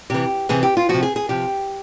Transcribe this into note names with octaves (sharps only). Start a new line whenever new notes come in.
C3 E3 G4
C3 E3 G#4
G4
F4
C3 F3 F#4
G#4
G#4
C3 F3 G4